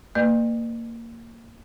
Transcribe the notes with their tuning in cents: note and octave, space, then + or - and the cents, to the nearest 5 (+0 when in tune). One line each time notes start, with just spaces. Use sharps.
A#3 -15 B4 +0 D5 +45